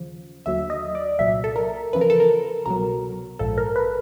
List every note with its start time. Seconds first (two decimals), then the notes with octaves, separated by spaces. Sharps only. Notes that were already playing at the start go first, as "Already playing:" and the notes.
Already playing: D#2 C#3 F3
0.46 D#2 D3 F#3 E5
0.70 D#5
0.95 D5
1.19 C2 A#2 F#3 E5
1.44 A4
1.56 A#4
1.93 E2 C#3 F3 B4
2.01 A#4
2.10 A4
2.20 A#4
2.66 C2 B2 F#3 A#4
3.39 A#1 G#2 F3 A4
3.58 A#4
3.76 B4